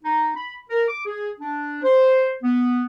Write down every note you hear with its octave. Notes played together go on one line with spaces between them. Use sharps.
D#4
B5
A#4
D6
G#4
D4
C5
B3